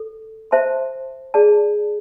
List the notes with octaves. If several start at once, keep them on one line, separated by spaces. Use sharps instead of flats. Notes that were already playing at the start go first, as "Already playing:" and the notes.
Already playing: A4
C5 E5 A5 C6
G#4 D5 A5